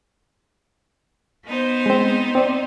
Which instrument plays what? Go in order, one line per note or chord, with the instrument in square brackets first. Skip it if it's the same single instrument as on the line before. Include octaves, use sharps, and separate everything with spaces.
[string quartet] B3 D#4 C5
[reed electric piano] G#3 C4
C4 D5